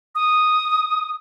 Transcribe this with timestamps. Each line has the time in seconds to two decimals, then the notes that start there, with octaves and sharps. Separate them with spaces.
0.15 D#6